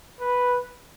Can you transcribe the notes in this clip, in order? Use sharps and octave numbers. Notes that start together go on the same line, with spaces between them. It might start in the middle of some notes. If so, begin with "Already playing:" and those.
B4